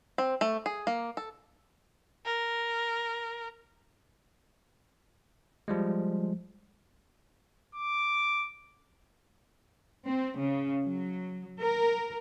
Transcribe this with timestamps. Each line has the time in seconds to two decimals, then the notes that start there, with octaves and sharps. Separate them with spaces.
0.18 C4
0.41 A3
0.66 G#4
0.87 A#3
1.17 A4
2.25 A#4
5.68 F3 G3 G#3
7.75 D6
10.07 C4
10.39 C#3
10.83 F#3
11.61 A#4